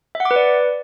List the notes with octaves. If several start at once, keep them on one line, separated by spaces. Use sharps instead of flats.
E5
F#5
D6
B4
D5